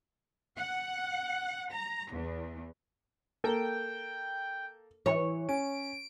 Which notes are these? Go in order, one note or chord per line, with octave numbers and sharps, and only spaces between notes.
F#5
A#5
E2
A#3 A4 G5
E3 C#5
C#4 D7